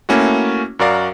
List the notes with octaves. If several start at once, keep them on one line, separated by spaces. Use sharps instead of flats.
A3 A#3 C#4 E4 F#4
F#2 F#4 A#4 D5 F5